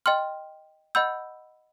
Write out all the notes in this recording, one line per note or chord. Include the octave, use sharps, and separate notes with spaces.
D#5 G5 C6 F6
D#5 F#5 B5 E6 G6